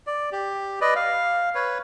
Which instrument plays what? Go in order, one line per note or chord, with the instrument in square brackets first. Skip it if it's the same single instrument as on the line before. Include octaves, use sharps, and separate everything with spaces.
[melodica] D5
G4
B4 D5 D#5
F5
B4 C#5